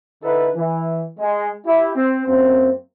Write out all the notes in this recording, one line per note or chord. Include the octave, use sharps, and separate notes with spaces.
D3 D#4 E4 A4 B4
E3
G#3
E4 G4
C4
F#2 A#3 C4